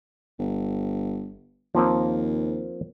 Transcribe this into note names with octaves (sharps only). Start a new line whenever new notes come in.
G1
D#2 F3 A#3 C4